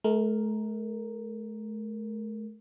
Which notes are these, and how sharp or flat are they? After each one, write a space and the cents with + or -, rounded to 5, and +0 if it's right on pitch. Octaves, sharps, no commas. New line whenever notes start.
A3 -40 A#4 +0